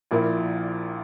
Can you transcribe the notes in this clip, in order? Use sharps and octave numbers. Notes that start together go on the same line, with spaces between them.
A#1 A#2 A#3 E4 A#4